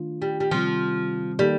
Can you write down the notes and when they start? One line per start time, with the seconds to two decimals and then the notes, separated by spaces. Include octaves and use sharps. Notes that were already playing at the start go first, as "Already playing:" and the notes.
Already playing: D#3 A3 D4 F4
0.22 G3
0.40 G3
0.51 C3 D#3 F3 G3 C4
1.39 D#3 G3 A#3 D#4 A4